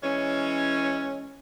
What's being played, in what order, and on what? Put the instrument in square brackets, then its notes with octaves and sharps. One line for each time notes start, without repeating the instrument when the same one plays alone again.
[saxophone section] E3 G#3 C#4